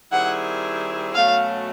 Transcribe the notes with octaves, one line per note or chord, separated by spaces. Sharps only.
D#3 G3 C4 E4 G#4 F#5
B2 F#3 A3 C#4 F5